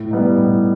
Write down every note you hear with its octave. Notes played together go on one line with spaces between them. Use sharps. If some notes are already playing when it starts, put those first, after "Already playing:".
Already playing: A2
G3 B3 D#4
A2